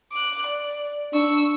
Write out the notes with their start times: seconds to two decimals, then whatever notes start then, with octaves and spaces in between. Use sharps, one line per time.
0.12 D6 F#6
0.46 D5
1.14 D4 C#6 E6